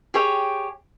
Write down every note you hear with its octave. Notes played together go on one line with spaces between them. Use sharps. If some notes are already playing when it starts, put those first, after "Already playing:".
G4 G#4 C#5 G5